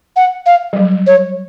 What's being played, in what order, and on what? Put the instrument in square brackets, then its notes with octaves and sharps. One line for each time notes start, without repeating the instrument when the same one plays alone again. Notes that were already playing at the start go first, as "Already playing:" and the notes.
[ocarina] F#5
F5
[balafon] G3
F#3
[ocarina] C#5